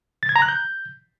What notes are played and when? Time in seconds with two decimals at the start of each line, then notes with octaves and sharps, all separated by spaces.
0.23 A6
0.29 G#6
0.36 A#5
0.42 F#6
0.48 G6